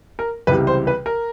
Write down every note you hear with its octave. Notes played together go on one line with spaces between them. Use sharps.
A#4
C#2 C3 E3 G3 B4
C5
B4
A#4